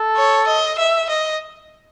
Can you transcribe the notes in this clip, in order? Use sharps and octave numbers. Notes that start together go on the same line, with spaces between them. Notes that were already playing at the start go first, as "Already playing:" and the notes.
Already playing: A4
C#5
D#5
E5
D#5